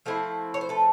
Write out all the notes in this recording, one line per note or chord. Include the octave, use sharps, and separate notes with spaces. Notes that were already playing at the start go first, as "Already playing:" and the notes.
F3 A3 C4 E4
C#5
C5
A4 B4